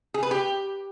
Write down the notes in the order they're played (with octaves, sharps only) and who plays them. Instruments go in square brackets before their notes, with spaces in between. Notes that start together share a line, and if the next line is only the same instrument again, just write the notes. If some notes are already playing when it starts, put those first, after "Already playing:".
[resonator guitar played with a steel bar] G#4
B4
G4